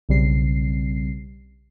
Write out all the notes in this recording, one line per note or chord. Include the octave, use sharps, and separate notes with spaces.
B1 C#3 G3 C4 C7